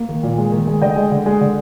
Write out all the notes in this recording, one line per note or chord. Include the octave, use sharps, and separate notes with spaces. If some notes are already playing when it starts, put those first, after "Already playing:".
Already playing: A#3
D#3
A#2
G#3
D#3
G#3
D3 D#5 G5
G#3
D3
G#3
D3